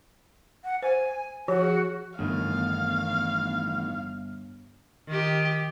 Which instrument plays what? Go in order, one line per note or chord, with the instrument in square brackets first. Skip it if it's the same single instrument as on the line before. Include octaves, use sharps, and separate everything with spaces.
[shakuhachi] F#5
[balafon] C5 [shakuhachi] G#5
[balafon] F3 G4 C#5 [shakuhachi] F#4
[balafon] G#4
[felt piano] G1 [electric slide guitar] E2 A2 D#3 [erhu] F5
[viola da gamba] D#3 G4